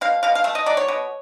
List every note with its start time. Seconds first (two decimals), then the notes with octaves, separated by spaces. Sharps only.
0.01 B2 F5
0.23 B2 F5
0.35 F5
0.44 A3 E5
0.55 D#5
0.66 F#3 D5
0.77 C#5
0.88 B2